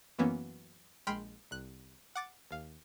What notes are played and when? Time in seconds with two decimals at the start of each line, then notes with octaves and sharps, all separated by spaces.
0.19 F#2 E3 A#3 B3 C#4
1.07 A#1 G#3 G5 B5 C6 F6
1.51 C2 F#6
2.15 F#5 D6 A6
2.51 D#2 F5